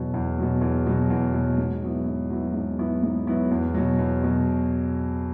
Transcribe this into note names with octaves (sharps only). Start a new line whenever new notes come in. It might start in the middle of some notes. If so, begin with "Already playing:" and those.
Already playing: E2 B2 F#3
E2
B2 F#3
E2
B2 F#3
E2
B2 F#3
G#2
F#3 B3 E4
G#2
F#3 B3 E4
G#2
F#3 B3 E4
G#2
F#3 B3 E4
E2
B2 F#3
E2
B2 F#3